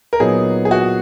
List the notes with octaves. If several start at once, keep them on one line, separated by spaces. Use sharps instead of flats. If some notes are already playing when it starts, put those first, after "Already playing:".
A#4
A#2 F#3 B3 D#4 G#4
G#4
F#4